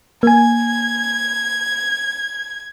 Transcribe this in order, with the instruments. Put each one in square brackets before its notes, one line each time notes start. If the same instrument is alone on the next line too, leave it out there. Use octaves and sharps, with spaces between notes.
[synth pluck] A#3 G#5 [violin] G#6